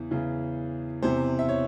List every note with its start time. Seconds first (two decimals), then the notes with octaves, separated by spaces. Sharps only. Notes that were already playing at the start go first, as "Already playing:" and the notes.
Already playing: E2 C#3 E3
0.11 E2 C#3 E3
1.03 E2 C3 E3 C5
1.39 E5
1.49 C#5